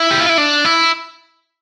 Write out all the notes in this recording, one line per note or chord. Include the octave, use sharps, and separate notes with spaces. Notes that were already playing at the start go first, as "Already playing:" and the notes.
Already playing: E4
G4
F4
E4
D4
E4